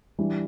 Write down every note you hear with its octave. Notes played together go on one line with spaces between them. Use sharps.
E3 G3 D4 G4